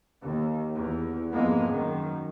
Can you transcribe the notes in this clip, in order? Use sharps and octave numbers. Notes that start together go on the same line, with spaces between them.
D#2
E2
F2 G#2 G#3 A#3 B3
F#2 D#3